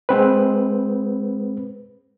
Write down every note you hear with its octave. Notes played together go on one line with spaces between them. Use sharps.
G#3 C4 B4